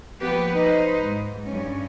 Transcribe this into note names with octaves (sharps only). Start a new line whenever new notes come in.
F3 A#3 B3 G4 B4
D#4 B4 C5 D#5
G#2
G2 C#4